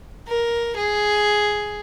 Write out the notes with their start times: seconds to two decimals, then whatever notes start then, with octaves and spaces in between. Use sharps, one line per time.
0.28 A#4
0.77 G#4